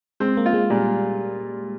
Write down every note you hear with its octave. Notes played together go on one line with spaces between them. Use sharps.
G#3 C4
A#3
F4
G#3
A#2 G3